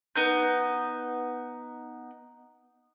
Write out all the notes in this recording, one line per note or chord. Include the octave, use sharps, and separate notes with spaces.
B3 D#4 G6